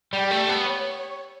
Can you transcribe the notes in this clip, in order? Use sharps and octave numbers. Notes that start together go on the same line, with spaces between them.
G3 G4
A3
B3
C#5